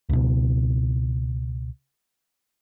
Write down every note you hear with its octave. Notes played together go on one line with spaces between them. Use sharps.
C#2 B2